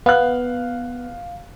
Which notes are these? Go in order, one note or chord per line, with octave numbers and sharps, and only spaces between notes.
B3 F5 F#6